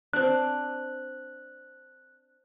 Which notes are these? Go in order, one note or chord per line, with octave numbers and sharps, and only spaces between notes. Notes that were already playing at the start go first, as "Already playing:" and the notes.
C4 D4 F#6